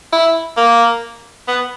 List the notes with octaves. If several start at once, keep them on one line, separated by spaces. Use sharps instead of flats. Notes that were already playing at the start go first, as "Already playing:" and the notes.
E4
A#3
B3